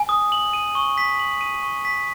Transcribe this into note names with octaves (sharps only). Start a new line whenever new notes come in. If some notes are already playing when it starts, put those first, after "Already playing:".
Already playing: G#5
D#6
F#7
D#7
C#6
B6
F#7
D#7
C#6
B6